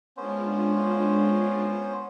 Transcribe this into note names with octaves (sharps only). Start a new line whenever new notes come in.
G#3 B3 C#4 D4 F4 C5